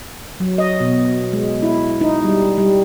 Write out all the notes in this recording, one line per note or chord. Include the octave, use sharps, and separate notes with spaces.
F#3
D#5
B2
G#3
E4
D#4
G3
G3